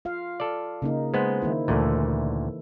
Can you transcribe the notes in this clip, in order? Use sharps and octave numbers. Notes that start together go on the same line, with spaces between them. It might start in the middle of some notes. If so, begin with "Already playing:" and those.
F4 F5
A4 D5
C#3 A#3 D#4
G#3 B3 C5
D#3 A#3 E4
D2 A#2 E3 A4